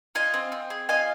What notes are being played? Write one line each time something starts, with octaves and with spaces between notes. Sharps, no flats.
F4 D#5 G#5
C4
C4
G#4
F4 D#5 G#5